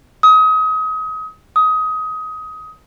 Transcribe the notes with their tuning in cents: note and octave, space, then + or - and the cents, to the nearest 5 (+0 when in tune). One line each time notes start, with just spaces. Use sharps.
D#6 +30
D#6 +20